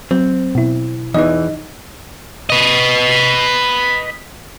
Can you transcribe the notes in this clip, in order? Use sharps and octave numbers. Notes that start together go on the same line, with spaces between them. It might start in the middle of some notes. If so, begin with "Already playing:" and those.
F#3 C4
B2 E4
E2 E3 D#4 D#5
B4 D#5